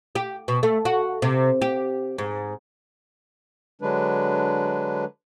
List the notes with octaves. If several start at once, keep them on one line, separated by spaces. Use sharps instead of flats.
G4
B2
A3
F#4
C3
G4
G#2
D3 F#3 G#3 D4 B4